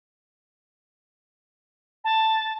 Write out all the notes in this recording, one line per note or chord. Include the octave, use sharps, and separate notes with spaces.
A5